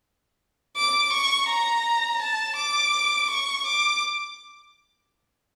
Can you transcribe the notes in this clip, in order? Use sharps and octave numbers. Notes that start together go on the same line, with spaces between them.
D6
C#6
A#5
A5
D6
C#6
D6